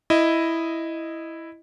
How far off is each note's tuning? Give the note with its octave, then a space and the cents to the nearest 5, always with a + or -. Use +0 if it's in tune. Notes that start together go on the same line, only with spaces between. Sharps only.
E4 +0 D#5 +0